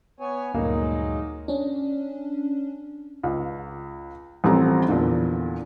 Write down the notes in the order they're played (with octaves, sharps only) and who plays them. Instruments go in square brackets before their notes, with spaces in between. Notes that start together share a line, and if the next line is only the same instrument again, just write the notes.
[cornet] B3 [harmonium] C#5 G#5
[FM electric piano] D2 G2 A#2 [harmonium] F#3 G#3 [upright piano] A#3 [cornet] D#4
[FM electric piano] C#4 D4
[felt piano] C#2
A1 F3 G3 C4 A4 A#5
E2 A#2 D3